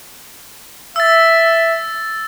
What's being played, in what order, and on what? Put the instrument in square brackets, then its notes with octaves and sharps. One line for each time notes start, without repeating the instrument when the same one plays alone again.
[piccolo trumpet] E5 [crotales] E6 A6